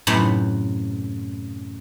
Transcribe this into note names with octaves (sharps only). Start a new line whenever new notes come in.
F#2 A2 C3 B3 B4